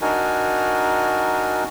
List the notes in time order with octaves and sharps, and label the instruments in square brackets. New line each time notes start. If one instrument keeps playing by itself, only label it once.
[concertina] D4 D#4 F#4 A#4 G#5